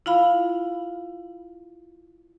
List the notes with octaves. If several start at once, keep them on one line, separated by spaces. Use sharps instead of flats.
E4 F4 F5 B5